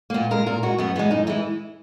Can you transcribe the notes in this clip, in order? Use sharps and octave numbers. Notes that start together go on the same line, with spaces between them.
A#3
A#2 B3
G#3 A#4
A#2 A#4
G#3 F#4
F#2 B3
E3 G#3 B3
F#2 D#4
E3 G#3 E4